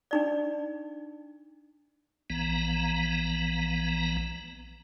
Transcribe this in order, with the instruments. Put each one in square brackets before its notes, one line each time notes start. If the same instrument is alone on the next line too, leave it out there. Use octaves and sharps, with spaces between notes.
[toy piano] D4 D#4 D5
[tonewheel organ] A#1 E3 B3 A#5